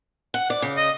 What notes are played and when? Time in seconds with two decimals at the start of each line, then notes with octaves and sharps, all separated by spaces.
0.34 F#5
0.50 D5
0.62 C#3
0.77 D#5